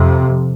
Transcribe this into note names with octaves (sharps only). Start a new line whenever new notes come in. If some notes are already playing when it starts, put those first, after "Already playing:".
Already playing: F2 C3